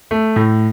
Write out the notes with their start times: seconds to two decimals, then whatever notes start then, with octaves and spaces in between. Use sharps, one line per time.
0.11 A3
0.36 A2